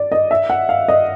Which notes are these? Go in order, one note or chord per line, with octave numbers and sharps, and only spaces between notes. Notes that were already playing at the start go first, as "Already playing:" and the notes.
Already playing: D5
D#5
E5
F#5
F5
D#5